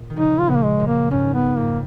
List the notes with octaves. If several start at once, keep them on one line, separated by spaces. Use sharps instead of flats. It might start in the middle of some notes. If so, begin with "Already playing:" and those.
Already playing: A#2
D#3
C#3 F3 D#4
F4
A#2 C#3 B3
A#3
G#3
F#2 A#2
A#3
F2 G#2 C#4
B3
F2 G#2 A#3